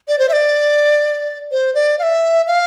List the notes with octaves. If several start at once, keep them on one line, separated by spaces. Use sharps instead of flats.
D5
C5
E5
D5
C5
D5
F5
E5
F5